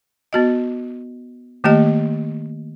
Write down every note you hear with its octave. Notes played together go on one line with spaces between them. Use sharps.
B3 F#4 D#5
D#3 A3 A#3 G4 D#5